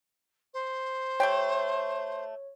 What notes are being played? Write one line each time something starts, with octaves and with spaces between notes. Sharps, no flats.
C5
A3 G4 C#5 G5